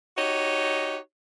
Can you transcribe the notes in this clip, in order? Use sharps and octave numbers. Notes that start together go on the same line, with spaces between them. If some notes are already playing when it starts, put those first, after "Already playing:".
D#4 F#4 G4 C#5 D#5